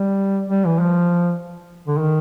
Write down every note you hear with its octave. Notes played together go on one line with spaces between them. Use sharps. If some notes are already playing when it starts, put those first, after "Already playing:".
Already playing: G3
G3
E3
F3
D3
D#3